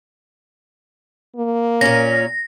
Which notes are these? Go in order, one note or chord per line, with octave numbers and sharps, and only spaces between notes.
A#3
A#2 C#4 A#6